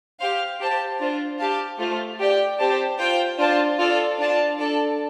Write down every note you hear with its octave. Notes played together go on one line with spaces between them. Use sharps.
G4 C5 F5
G4 C5 A5
D4 F4 C5
G4 F5 A5
A3 F4 C5
G4 D5 G5
C4 G4 C5 A5
F4 C5 G5
D4 F4 C5 A5
F4 A4 D5
D4 F4 D5 A5
D4 A4 D5 A5